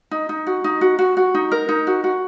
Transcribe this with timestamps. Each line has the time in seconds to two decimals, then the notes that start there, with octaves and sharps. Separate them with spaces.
0.11 D#4
0.29 D#4
0.47 F#4
0.64 D#4
0.81 F#4
0.99 F#4
1.17 F#4
1.34 D#4
1.52 A#4
1.69 D#4
1.87 F#4
2.04 F#4